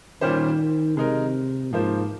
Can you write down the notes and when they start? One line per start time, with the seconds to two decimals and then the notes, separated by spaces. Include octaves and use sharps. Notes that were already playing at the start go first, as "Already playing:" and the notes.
0.21 A#2 D#3 G3 C#4 G4 C5
0.97 C3 G#3 D#4 A#4
1.72 G#2 F3 A#3 F4 C5